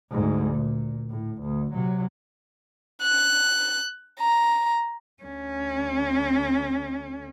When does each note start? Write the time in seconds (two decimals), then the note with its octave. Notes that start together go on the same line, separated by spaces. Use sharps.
0.11 D2 G#2
0.56 A#2
1.10 A2
1.43 D2
1.74 C3 F#3
3.02 F#6
4.20 A#5
5.23 D2 C#4